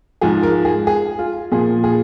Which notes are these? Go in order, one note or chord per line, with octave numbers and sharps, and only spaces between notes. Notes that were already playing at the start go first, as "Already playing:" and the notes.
G#2 F3 G#4
A#4
G#4
G#4
F4
A#2 F3 G#4
G#4